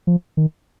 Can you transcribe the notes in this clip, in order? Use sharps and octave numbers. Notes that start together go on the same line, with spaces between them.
F3
D#3